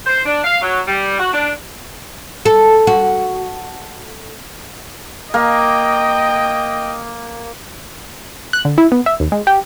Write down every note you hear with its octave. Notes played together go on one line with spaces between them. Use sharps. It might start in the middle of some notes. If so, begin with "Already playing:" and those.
C5
D4
F5
F#3
G3
F#4
D4
A4
F#4
A#3 D#5 G5
F#6
D3
E4
B3
E5
D#2
G#3
G4